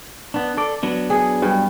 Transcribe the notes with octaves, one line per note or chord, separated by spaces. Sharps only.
B3 D4
A4 D5
F#3 B3 D4
G#4
G2